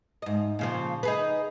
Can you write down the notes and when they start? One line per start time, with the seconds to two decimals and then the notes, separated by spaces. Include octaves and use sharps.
0.22 G#2 D#5
0.59 A#2 C#3 F3
1.03 D#4 G#4 B4